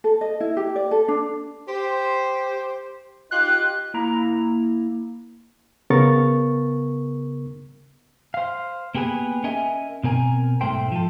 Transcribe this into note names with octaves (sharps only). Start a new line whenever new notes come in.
A4
D#5
E4
G4
D5
A4
D4
G4 C5
D#4 F4 G4 F#6
A#3 E4 A#5
C#3 B3 A#4 C#6 A6
C5 F5
A#3 B3 G4 G#4 B4
C#4 A#4 D#5 E5 G#5
B2 C4 A#4 G#5
B1 G#2 A3 A4 C5 G5
F3 A4